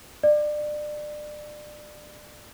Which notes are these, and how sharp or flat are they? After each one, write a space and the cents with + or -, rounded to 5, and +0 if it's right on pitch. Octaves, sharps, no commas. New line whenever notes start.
D5 +25